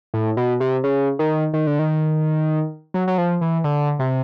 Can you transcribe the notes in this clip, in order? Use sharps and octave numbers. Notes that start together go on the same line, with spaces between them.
A2
B2
C3
C#3
D#3
D#3
D3
D#3
F#3
F#3
F3
E3
D3
C3